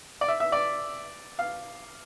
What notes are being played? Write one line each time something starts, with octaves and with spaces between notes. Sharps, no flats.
D5
E5
E5
D5
F5